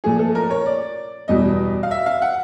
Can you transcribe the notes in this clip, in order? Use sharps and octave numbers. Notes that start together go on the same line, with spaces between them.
A#2 F3 A3 G#4
A4
A#4
C#5
D5
E2 B2 G3 D#5
F5
E5
F5
F#5